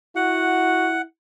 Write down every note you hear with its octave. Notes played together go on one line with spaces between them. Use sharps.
E4 F#4 F#5